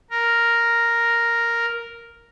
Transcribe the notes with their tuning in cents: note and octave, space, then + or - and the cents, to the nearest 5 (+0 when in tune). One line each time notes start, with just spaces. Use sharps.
A#4 +0